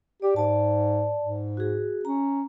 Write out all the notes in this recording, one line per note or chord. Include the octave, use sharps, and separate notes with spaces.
G4 D5
G#2 D5 A5
G#2
F#4 G#4
C#4 A#5